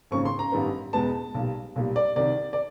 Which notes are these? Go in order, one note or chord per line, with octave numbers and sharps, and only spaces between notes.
G#1 F#2 C#3 F3 A#3 C#6
C6
A#5
A1 G2 D#3 G3 B3
E2 B2 G#3 B3 A5
B1 A#2 G3
B1 A#2 G3
D5
C2 C3 D#3 D5
D5